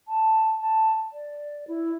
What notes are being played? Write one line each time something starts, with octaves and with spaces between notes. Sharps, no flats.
A5
A5
D5
E4